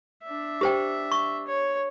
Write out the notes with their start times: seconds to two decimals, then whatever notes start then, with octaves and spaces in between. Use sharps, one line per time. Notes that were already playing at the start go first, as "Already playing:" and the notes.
0.24 D4 E5
0.61 G4 C5 G5
1.12 C#6
1.47 C#5